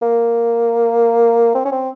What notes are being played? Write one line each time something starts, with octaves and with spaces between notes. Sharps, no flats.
A#3
C4
C#4
C4